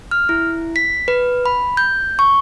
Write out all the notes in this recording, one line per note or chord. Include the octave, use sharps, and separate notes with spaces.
F6
E4
B6
B4
B5
G6
C#6